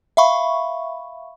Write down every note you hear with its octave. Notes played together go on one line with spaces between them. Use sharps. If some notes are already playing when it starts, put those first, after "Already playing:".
E5 F5 B5 C#6